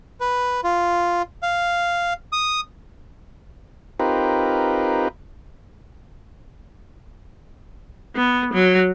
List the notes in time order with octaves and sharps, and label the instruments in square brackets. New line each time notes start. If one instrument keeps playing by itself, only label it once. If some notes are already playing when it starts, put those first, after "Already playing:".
[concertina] B4
F4
F5
D#6
[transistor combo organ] C4 D#4 F4 G4 A#4 B4
[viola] B3
F#3